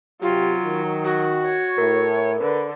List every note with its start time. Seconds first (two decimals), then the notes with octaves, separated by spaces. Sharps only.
0.22 C3 F#3 F4 G4
0.65 D#3
1.05 F#4
1.45 C#5
1.78 A2 A#4
2.41 D3 B4